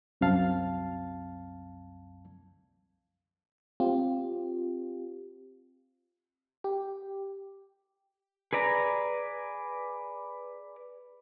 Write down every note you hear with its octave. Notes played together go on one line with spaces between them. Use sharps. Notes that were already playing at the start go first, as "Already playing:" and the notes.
C2 F#2 C4 F5 A5
C4 F4 G4
G4
G#4 B4 D5 A#5